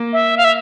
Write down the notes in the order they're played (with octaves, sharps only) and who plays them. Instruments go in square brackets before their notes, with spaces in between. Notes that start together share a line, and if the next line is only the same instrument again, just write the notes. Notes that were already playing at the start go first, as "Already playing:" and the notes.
Already playing: [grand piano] A#3
[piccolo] E5
F5
E5